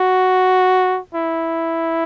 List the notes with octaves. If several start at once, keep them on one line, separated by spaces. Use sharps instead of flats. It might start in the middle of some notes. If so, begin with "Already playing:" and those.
Already playing: F#4
E4